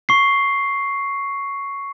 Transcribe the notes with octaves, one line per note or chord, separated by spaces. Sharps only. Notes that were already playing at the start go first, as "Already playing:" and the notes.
C#6 C7